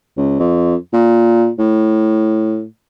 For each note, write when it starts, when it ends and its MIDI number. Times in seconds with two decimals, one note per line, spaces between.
0.17 0.38 37
0.39 0.75 41
0.93 1.50 46
1.59 2.64 45